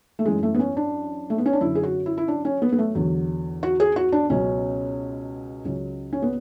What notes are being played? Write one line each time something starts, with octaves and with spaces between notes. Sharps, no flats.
A3
F#2 E3 G#3
A3
B3
C#4
D4
A3
B3
C#4
D4
F#2 D3 F#3 E4
G#4
F#4
E4
E4
D4
C#4
B3
B3
A3
E2 D3 F#3
F#4
G#4
F#4
D4
C#2 B2 F#3 C#4
C#2 C#3 F#3
C#4
B3